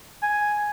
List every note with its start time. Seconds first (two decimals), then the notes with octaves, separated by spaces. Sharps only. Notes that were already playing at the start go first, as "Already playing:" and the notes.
0.23 G#5